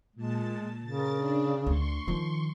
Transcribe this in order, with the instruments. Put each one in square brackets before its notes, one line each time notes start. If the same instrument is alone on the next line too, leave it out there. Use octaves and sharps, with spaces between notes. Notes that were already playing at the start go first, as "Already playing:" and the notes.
[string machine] A#2 A5 [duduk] G#3
[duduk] C#3 [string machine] A#4 A6
[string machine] D4
[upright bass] D2 [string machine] C6 C#6
[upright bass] D#3 F3